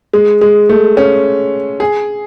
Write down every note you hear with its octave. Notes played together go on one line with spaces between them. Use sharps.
G#3
G#3
A3
C#4
G#4